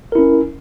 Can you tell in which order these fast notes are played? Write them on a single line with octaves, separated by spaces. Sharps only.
A#4 E4 C#4